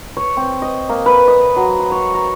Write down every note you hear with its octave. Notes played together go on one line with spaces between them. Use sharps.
C#5
C4
D#5
A#3
B4
D#5
F#3
C6
C#5
A#5